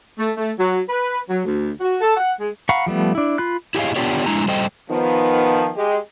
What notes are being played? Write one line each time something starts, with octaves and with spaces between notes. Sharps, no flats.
A3
A3
F#3
B4
F#3
D2
F#4
A4
F#5
G#3
F5 F#5 A#5 B5 C#6
F3 G3 A3 B3
D4 E4
F4 B5 F#6
E4 G4 G#4 C#5 D#5 F5
B3 D4 F4 G4 A#4 C#5
G#3 D4 E4 A#5
G3 A4 C5 D#5 G5
D#3 F3 B3
G#3 G4 D#5